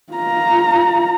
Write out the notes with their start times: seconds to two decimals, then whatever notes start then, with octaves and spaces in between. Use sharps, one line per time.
0.13 F4 A#5